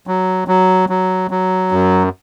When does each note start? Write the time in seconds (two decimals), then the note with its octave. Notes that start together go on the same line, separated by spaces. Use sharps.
0.07 F#3
0.48 F#3
0.89 F#3
1.31 F#3
1.72 F#2